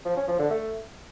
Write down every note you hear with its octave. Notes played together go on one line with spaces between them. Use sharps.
F3
C#4
F3
D3
A3